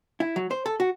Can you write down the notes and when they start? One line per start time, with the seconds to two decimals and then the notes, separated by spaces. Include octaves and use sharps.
0.20 E4
0.36 F#3
0.51 C5
0.66 A4
0.80 F#4